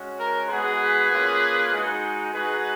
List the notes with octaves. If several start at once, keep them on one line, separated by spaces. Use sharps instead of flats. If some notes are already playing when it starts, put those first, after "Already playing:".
Already playing: G#3 C#4 F#4
A#4
G#3 B3 F#4 G#4 B4
A#3 C#4 F4
G#3 D#4 F#4
G#3 D#4 F#4 G#4 B4